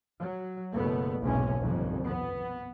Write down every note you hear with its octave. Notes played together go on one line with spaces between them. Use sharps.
F#3
F#1 B2 A3 B3
F#1 B1 E2 G#2 C3 C#4
G1 C2 F2 D#3
B3